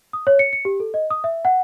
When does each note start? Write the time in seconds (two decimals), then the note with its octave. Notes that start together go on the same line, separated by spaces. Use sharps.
0.13 D#6
0.27 C#5
0.39 C#7
0.53 C#7
0.65 G4
0.80 A4
0.94 D#5
1.10 D#6
1.24 E5
1.45 F#5